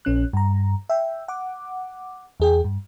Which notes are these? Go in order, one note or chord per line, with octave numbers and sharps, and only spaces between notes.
A#1 C#4 F#6
G2 A#5
E5 G5
F#5 D6
E2 G#4 G5
G2